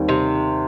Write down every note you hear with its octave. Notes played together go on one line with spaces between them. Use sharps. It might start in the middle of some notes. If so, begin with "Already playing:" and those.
Already playing: D#2 D#3 G3 C4
C3